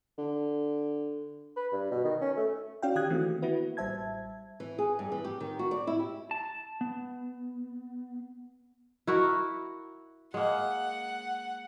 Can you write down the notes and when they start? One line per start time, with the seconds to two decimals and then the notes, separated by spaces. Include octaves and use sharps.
0.18 D3
1.57 B4
1.72 G2
1.92 B2
2.04 D#3
2.21 C#4
2.37 A3
2.82 C#4 F#4 D5 F5 G5
2.95 D#3 G4 G5 D#6 F#6 G#6
3.10 D#3 E3 A3 A#3 C4 F#4
3.42 A#3 B3 E4 F#4 B4
3.77 A1 G3 C5 E5 A5 G#6
4.60 E3
4.79 G#4
4.99 G2
5.12 E3
5.24 G4
5.40 D#3
5.59 F#4
5.71 D5
5.87 E4
5.99 G4
6.31 A5
6.81 B3
9.07 E4 F#4 A#4
10.34 G#3 A#3 F#5